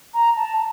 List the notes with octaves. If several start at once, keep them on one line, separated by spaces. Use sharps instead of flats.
A#5
A5